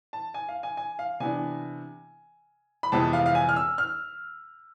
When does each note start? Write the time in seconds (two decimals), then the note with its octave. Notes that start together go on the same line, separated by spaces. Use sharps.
0.13 A5
0.34 G#5
0.49 F5
0.63 G#5
0.77 G#5
0.99 F5
1.20 C3 E3 B3 D4 G#5
2.83 B5
2.92 F2 C3 E3 G#3 B3 A5
3.13 F5
3.26 F5
3.35 G#5
3.49 F6
3.56 E6
3.78 F6